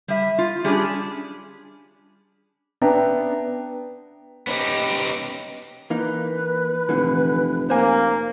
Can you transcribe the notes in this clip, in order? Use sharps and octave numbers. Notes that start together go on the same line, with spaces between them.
G3 E5
F4
G3 C#4 D4 G4 G#4
B3 D4 E5 G5 A#5
B3 C#4 D#4 G4
E3 A#3 D#4 B4
F1 A#2 D3 E3
A#3 C5 G#5